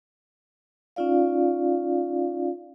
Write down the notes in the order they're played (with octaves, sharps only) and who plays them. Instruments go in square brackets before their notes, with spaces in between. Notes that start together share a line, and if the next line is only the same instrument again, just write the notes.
[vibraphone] C#4 D#4 F4 D5 F5